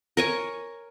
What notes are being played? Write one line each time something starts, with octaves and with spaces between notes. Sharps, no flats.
A#4 C#5 G#5